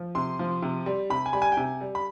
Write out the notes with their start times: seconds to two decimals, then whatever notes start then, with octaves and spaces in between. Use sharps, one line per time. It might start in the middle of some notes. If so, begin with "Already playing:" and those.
Already playing: F3
0.15 C3 C6
0.39 F3
0.62 C3
0.86 G3
1.10 C3 B5
1.26 G#5
1.33 G3 B5
1.42 G#5
1.52 G5
1.57 C3 G#5
1.81 G3
1.95 B5